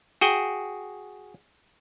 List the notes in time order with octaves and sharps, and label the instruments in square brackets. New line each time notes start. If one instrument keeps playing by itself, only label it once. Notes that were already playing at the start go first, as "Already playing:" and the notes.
[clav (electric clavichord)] F#4 G#4 G5